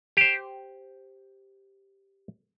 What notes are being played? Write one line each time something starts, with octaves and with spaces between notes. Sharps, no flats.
G4 C5